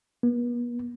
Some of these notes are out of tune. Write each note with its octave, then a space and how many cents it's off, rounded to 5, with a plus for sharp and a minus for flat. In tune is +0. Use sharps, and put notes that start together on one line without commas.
B3 -40